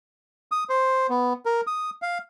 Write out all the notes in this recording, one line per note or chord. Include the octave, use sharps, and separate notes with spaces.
D#6
C5
B3
A#4
D#6
F5